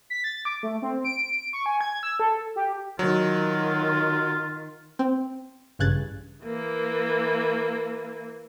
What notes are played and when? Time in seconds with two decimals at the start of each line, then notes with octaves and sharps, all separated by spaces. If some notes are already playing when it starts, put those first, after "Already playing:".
0.10 B6
0.24 A6
0.45 D6
0.63 A3
0.82 C4
1.05 D7
1.53 C#6
1.66 G#5
1.81 G#6
2.03 E6
2.20 A4
2.56 G4
2.99 D#3 F#3 F4
4.99 C4
5.79 A1 G2 C#3 F#6 G#6 A6
6.45 E3 A#3